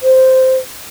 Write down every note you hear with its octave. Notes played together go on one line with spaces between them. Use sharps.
C5